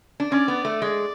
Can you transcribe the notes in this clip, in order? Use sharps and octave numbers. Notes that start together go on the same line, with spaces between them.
D4
C#4 D5
B3
A3
G#3 D5